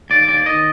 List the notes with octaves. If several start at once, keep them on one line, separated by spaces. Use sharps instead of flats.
D#2 D5
D#2 D5
D#3 D#5